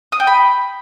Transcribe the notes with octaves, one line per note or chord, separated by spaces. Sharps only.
D#6
G5
B5